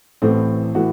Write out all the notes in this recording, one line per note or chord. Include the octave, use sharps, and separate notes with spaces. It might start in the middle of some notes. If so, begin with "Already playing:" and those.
A1 A2 E3 A3 C4
A2 E3 F#4